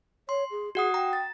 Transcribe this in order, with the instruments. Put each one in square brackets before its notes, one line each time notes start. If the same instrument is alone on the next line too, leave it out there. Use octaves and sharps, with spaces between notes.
[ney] C#5 [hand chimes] C6
[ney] G#4
[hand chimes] F#4 F#5 D#6 [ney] G#4
[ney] G5 [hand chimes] A#5
[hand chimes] A6